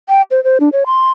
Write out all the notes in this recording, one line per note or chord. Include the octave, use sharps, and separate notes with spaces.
G5
C5
C5
D4
C#5
C6